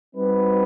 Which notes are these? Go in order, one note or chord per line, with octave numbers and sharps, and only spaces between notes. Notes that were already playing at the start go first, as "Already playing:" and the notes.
G3 C4 D#4 F#4 B4